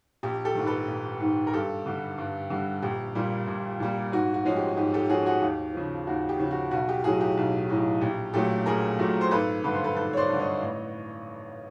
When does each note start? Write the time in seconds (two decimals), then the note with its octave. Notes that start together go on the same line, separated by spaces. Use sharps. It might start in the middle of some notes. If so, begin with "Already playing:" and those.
0.23 A#1 G4
0.45 G4 A4
0.55 G#2 D#3
0.66 A4 B4
0.88 A#1
1.20 G#2 D#3
1.47 A#4
1.53 G2 G4 A4
1.86 D3 G3
2.18 G2
2.50 D3 G3
2.82 A#1 G4
3.15 A#2 G3 A#3
3.47 A#1
3.80 A#2 G3 A#3
4.12 G#2 F#4
4.34 F#4
4.45 F3 G#3 C#4
4.56 G4
4.77 G#2 G4
4.94 G4 A4
5.09 F3 G#3 C#4 F#4 G#4
5.26 F#4 G#4
5.42 D#2 G4
5.74 C#3 F3
6.07 D#2 F#4
6.29 G4
6.39 C#3 F3
6.51 F#4
6.71 B1 F#4
6.89 G4
7.04 A2 F#3 F#4 G#4
7.21 G4
7.37 B1
7.70 A2 F#3
8.01 A#1 G4
8.33 A#2 F#3 A3 G4 A4
8.66 A#1 G#4 A#4
8.99 A#2 F#3 A3
9.21 C5
9.31 G#1 A4 B4
9.64 G2 D3 B4
9.74 C5
9.84 A4 B4
9.95 G#1 A4 B4
10.13 C#5
10.17 C5 D5
10.29 G2 D3
10.39 C#5 D#5
10.61 A1